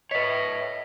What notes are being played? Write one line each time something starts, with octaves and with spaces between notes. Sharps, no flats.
B4 C#5 D#5 E5 B6